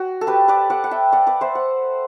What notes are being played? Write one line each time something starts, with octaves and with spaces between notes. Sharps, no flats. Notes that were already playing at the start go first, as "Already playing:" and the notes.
Already playing: F#4
A4
G4 B4
B4 D5
D5 F#5
F#5
E5 G5
D5 F#5
B4 D5
C5 E5
F#5